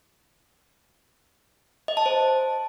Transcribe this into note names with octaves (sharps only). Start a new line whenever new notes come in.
D#5
A5
C5